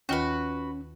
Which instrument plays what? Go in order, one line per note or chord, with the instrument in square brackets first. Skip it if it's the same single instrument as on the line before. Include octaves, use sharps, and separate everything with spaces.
[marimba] D#2 D#3 F4 [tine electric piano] C#4 [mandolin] F#4 B4